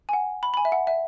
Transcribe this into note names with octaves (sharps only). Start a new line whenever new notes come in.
G#5
F#5
B5
B5
G#5
E5
F#5
E5